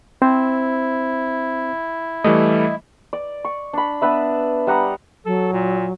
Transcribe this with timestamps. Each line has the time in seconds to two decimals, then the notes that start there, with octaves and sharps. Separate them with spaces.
0.22 C4 E4 C5
2.24 E3 G3 A3 D#5
3.13 D5
3.45 C#6
3.73 D4 B5
4.02 B3 D4 B4 E5
4.67 G3 F#5 A#5 D#6
5.26 F#3 A4
5.53 A#2